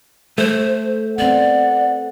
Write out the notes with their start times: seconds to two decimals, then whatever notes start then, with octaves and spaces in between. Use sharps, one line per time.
0.38 A3 C5
1.18 B3 C4 D5 F#5